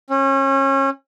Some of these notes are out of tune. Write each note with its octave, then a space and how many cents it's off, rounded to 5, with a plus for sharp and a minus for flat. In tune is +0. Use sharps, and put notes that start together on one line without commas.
C#4 -30